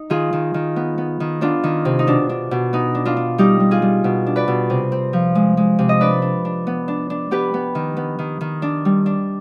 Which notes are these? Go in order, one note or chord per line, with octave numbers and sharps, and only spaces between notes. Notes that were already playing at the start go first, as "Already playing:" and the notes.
Already playing: D#4
D#3 F4 G#4
D#3
D#3
B3
B3
D#3
B3 D4 F4
D#3
C3
D#4
B2 D4
D4
B2
B3 D#4
D4
D4 F4
D4
G3 D#4 G4
G3
F4 G#4
G3
B2
D4
B4 D5
B2
C3
C4
F3
G#3
G#3
C3
D#5
D4 B4 D5
D4
D4
B3
D4
D4
B3 G4 B4
B3
D#3
B3
D#3
D#3
D4
G3
D4